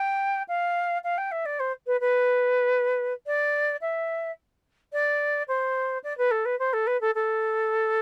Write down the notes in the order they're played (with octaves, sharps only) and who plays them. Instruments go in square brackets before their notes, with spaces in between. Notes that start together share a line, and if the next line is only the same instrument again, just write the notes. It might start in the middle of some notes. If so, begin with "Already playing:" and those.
Already playing: [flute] G5
F5
F5
G5
E5
D5
C5
B4
B4
D5
E5
D5
C5
D5
B4
A4
B4
C5
A4
B4
A4
A4